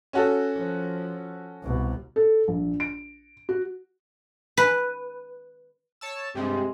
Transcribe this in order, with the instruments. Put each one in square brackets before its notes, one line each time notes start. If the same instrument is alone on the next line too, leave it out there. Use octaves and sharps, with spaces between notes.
[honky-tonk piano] C#4 F#4 A4
[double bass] F3
C2 B2
[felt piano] A4
A#1
D7
F#4
[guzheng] B4
[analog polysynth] C#5 A5 E6
[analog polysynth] G2 G3 [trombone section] C3 G#3 C4